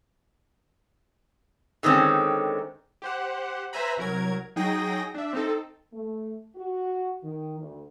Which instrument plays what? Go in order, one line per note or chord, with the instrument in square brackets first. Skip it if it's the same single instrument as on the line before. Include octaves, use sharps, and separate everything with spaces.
[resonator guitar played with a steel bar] D3 D#3 G#3 C4 C#4
[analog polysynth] G4 C5 F#5
B4 C5 E5 G#5 A#5 B5
C2 F#3 A#4 G#6
F#3 D#4 G#4 G5 D#6 A#6
D4 E5
C4 D#4 A4
[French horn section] A3
F#4
D#3
D2